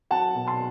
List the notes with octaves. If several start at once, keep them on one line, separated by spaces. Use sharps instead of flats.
F#3 F#5 A5
B2
A5 C6